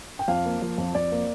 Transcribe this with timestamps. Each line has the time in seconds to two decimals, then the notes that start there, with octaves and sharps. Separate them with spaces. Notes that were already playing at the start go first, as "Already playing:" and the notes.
0.19 G5
0.28 F2 F5
0.45 A#3
0.62 F3
0.78 F2
0.95 F2 D5
1.12 A#3